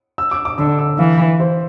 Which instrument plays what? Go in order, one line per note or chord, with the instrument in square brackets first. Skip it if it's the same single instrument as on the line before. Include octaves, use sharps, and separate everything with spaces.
[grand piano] E6
D6
D6
[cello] D3 [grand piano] E6
[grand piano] E6
[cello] E3 [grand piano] F5
[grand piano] C5